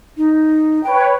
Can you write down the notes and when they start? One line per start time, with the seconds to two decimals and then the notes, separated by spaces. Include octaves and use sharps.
0.17 D#4
0.84 B4 C#5 G5